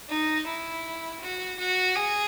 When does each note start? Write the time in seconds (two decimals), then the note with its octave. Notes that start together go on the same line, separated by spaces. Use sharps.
0.09 D#4
0.46 E4
1.21 F#4
1.58 F#4
1.95 G#4